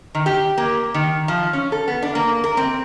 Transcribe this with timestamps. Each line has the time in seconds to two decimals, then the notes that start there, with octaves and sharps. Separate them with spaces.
0.15 D#3
0.26 G4
0.58 A#3
0.94 D#3
1.28 F3
1.53 C#4
1.72 A4
1.88 B3
2.03 D4
2.15 A#3
2.44 A#4
2.57 C4